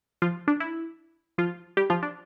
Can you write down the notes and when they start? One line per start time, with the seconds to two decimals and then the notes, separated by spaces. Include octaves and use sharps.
0.22 F3 F4
0.48 D4
0.60 E4
1.38 F3 F4
1.77 G3 G4
1.90 F3 F4
2.03 D4